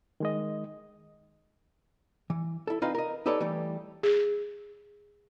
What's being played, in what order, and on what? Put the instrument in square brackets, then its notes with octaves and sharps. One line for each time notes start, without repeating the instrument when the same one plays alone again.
[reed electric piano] D#3 G#3 D#5
[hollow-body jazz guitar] E3
E4 A4
C4 D#4 F4 B4 D#5 F5
A#4 D#5
D#4 G4 A4 B4 C#5 D5
E3 G3 A3
[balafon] G#4